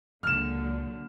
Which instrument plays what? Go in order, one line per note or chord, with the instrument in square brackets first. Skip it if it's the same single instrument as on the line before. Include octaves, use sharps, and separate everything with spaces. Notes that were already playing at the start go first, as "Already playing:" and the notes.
[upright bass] C#2 [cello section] A#2 D3 F#3 [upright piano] F6 E7